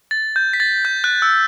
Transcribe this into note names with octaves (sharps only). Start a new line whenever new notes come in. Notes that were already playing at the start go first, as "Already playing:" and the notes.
A6
G6
B6
A6
G6
F#6
E6